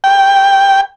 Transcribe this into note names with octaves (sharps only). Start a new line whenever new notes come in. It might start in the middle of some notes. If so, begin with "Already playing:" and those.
G5